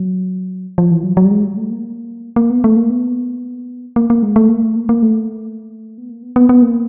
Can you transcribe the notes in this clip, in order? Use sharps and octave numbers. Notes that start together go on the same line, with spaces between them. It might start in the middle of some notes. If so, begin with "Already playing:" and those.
Already playing: F#3
F3
E3
F#3
F#3
G3
G#3
G3
A3
A#3
A#3
B3
A3
A#3
B3
A#3
A#3
G#3
A3
A#3
A3
A#3
A#3
A3
B3
A#3
B3
B3
B3
A#3